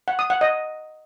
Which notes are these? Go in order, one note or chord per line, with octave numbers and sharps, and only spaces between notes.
F#5
D#6
F#5
D#5